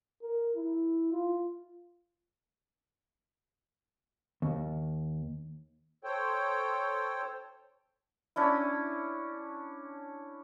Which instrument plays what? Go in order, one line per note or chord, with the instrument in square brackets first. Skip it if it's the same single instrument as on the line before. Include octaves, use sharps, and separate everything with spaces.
[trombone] A#4
E4
F4
[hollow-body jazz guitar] D#2
[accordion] A4 C5 C#5 G5
[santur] C#4 D4 E4